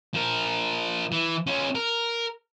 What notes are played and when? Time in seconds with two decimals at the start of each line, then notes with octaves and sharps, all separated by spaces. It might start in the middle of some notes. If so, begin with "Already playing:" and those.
0.14 F3 A#4
1.12 E3
1.47 C#4 F4
1.75 A#4